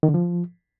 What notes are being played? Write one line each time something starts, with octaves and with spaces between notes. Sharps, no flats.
D#3
D3
F3